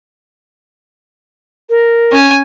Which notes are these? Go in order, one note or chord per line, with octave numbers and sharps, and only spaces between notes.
A#4
C#4 G#5